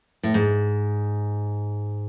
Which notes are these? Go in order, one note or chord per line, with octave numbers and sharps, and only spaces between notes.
A2
G#2